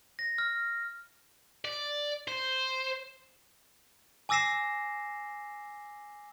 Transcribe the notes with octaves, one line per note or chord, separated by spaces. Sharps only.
A#6
F6
D5
C5
G#5 D6 E6 A#6 C7 E7